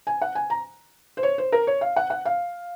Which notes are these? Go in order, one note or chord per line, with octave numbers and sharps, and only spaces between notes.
G#5
F#5
G#5
A#5
C5
C#5
C5
A#4
C#5
F5
F#5
F#5
F5